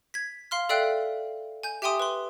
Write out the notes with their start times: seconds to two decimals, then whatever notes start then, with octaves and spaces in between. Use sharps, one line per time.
0.14 G#6 B6
0.51 F5 C6 F6
0.69 A4 D5 E5 F5 G5 F#6
1.63 G#5 G6
1.82 G4 E5 G5 G#5 C6 D#6
2.00 B4 C6